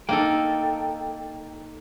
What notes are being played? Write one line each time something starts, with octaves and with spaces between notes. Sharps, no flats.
A#3 D#4 A4 G5